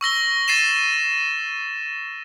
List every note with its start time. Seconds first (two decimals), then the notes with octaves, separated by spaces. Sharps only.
0.01 C#6 E6 A#6 G7
0.48 A6 C7 D#7 E7